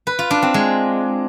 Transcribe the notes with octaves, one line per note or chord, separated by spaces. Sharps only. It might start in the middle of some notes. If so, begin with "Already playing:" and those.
B4
F4
D4
C4
G#3